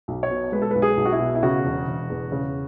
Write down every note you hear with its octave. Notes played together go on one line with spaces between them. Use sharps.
B1
C#5
B2
G#3 B4
A4
B1 B4
G#4
B1
F#4
E4
B2
E4
C#3 F#4
E1
E1
E2
C#3